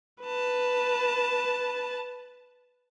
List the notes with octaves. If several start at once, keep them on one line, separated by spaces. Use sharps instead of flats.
B4 A5